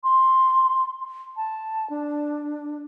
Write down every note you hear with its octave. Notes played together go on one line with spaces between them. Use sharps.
C6
A5
D4